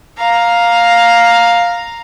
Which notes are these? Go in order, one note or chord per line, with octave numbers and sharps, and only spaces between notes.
F5 A#5